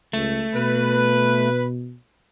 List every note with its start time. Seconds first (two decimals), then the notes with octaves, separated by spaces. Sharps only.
0.13 C#2 A3
0.54 B2 B4